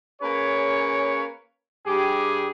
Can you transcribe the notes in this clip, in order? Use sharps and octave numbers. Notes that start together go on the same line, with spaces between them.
A#3 C#4 G#4 B4 C#5
G2 G4 G#4